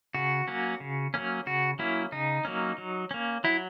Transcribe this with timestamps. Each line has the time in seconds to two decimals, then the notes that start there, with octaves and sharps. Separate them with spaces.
0.14 C#3 F#4
0.48 F#3 A#3 C#4
0.80 C#3
1.14 F#3 A#3 C#4
1.47 C#3 F#4
1.79 F#3 A#3 C#4 E4
2.12 C#3 D#4
2.45 F#3 A#3 C#4
2.78 F#3
3.11 A#3 C#4
3.44 F#3 E4